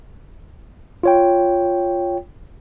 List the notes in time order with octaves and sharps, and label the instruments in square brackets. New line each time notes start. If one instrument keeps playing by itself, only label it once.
[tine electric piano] F4 C#5 G5